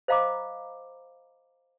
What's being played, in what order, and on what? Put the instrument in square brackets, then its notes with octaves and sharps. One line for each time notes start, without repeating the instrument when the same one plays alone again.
[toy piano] C5 D#5 F5 A#5 B5 D6